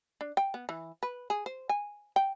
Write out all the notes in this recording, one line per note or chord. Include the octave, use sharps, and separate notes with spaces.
D4
G5
B3
E3
B4
G#4
C5
G#5
G5